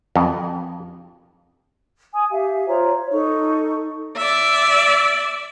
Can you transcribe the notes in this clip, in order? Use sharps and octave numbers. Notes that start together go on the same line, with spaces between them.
F2
G#5 D#6
G4 E5 F5
F4 C5 C#5 A#5
C#5
D#4 A4 C#6
D5 E5